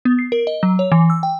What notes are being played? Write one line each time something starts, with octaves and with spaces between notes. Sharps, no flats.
B3
C7
A#4
D#5
F#3
C#5
E3
E6
G5